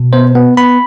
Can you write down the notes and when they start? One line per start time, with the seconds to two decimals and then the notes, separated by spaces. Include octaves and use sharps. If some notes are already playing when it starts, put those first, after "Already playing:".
Already playing: B2
0.13 B3 C5
0.35 B3
0.57 B3 B5